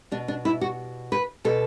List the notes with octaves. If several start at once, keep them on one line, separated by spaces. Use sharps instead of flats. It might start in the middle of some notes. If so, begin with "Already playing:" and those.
B2 D4
D4
E4
F#4
B4
B2 A4